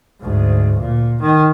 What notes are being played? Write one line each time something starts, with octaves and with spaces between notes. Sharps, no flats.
D2 G#2
A#2
D#3